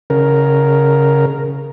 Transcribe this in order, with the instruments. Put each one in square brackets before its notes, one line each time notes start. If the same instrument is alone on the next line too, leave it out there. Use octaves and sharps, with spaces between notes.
[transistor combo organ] C#3 A#4